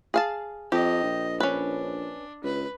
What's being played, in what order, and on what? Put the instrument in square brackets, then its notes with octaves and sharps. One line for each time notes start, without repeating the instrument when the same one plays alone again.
[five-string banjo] G#4 F5 A5
[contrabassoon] F2 [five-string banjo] G4 [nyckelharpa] D#5
[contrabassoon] A#1
[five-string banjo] C#4 B4 [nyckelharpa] D4
[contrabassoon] C#2 [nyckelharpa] B4